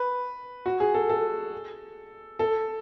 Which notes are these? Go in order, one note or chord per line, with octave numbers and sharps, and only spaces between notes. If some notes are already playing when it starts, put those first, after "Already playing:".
Already playing: B4
F#4
G#4
A4
A4
A4